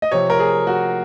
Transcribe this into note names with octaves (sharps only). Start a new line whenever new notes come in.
D#5
C3 F3 C4 C#5
A#4
G#4
F#4